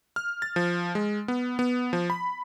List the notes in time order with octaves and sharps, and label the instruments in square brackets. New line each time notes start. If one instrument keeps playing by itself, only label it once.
[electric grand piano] F6
A6
F3
G#3
B3
B3
F3
B5